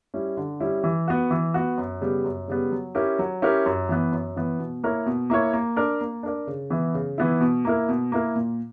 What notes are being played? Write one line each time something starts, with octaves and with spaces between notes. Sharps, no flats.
G3 C#4 E4
D3
G3 C#4 E4
E3
B3 F#4
E3
B3 F#4
F#2
C#3 G3 B3
F#2
C#3 G3 B3
F#3
C#4 E4 G4 A#4
F#3
C#4 E4 G4 A#4
F#2
E3 B3
F#2
E3 B3
B2
A#3 E4 A#4 C#5
B2
A#3 E4 A#4 C#5
A#3
D4 A#4 D5
A#3
D4 A#4 D5
C#3
E3 B3 E4
C#3
E3 B3 E4
B2
A#3 E4 A#4
B2
A#3 E4 A#4
A#2